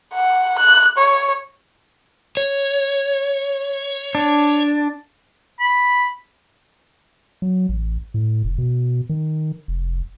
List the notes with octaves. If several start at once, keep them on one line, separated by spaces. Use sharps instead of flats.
F#5
F#6
C#5
C#5
D4
B5
F#3
A1
A2
F1
B2
D#3
F1